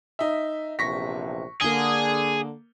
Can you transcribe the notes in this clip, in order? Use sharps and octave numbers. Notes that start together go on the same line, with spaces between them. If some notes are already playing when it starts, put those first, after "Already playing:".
D#4 E5
A#1 E2 C3 C#6 A#6 B6
D3 A#3 G#4 G7